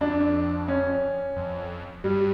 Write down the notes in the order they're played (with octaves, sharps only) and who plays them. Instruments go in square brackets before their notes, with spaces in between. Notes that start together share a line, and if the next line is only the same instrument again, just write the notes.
[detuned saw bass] F2 [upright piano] D4
[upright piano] C#4
[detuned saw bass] F2
[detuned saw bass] G2 [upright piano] G3